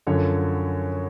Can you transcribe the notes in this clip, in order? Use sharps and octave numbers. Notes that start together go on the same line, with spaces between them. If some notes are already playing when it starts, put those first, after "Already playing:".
F#2 D3 F3 C#5